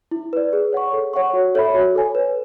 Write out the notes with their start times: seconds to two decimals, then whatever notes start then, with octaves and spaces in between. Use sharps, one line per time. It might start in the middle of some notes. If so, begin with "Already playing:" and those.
0.11 E4
0.33 B4 D5
0.53 G#4
0.72 C#5 F#5 C#6
0.93 A4
1.14 C#5 F#5 C#6
1.33 F#4
1.55 A4 C#5 E5 B5
1.74 F#4
1.95 A4 C#5 G#5
2.15 B4